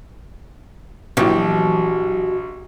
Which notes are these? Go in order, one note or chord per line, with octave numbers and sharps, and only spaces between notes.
A#1 B2 E3 F#3 G4